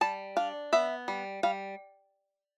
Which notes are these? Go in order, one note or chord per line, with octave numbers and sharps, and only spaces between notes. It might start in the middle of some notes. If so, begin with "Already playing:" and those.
G3 A5
D4 F5
B3 E5
G3
G3 F5